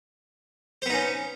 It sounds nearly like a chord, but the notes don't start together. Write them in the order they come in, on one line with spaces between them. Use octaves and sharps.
C5 B3 D#4 C#4